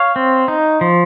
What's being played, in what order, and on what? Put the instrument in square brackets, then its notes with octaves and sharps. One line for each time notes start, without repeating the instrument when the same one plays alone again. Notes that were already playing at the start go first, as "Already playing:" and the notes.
Already playing: [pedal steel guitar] C#5 F5
C4
D#4
F3